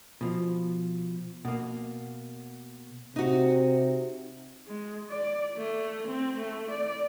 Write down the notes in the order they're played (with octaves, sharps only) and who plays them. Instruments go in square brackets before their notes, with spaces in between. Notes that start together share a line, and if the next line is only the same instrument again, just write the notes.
[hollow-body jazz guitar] B2 F3
B2 A#3
[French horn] C3 [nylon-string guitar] D#4 F#4
[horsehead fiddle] G#3
D5
A3
C4
A3
D5